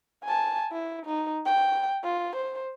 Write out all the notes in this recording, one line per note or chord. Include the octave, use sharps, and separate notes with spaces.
G#5 A5
E4
D#4
G5
F4
C5